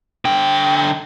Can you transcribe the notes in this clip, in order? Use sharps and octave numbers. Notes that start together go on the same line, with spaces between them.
D3 G5